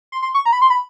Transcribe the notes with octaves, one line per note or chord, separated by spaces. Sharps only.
C6
C6
C#6
A#5
B5
C6
B5